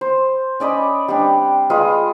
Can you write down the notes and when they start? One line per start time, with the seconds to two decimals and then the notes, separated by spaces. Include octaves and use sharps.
0.01 C5
0.60 C#4 D5 D#5 B5
1.08 G3 C4 D4
1.70 G#3 F4 B4 D#5